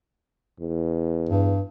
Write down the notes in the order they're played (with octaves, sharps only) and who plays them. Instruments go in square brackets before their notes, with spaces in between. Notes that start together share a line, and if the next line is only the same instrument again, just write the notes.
[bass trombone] E2
[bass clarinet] G2